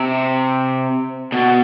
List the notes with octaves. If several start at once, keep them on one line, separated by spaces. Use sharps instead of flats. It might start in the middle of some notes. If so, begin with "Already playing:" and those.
Already playing: C3
B2